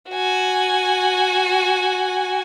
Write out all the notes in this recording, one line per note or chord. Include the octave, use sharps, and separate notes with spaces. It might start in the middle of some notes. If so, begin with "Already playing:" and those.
F#4 G#5